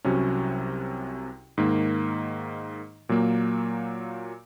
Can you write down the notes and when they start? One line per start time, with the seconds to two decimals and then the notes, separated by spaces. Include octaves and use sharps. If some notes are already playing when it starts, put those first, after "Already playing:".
0.04 C2 C3 F#3 C#4 F#4
1.58 G#2 D#3 A#3
3.09 A#2 F#3 A#3